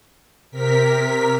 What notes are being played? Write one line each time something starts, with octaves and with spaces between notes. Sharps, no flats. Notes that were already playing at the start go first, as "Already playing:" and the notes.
C3 A#4 B6